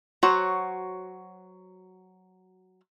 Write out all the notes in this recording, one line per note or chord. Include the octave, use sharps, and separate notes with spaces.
F#3 F#4 C5 C#5